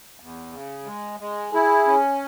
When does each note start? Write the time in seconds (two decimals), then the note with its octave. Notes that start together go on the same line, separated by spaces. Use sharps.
0.20 E2
0.52 C#3
0.86 G#3
1.20 G#3
1.53 E4 G#4
1.87 C#4